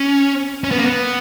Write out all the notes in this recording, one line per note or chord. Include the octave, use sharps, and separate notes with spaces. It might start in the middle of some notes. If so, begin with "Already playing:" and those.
Already playing: C#4
C#4
B3
A#3
B3